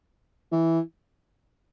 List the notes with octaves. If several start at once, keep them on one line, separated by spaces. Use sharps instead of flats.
E3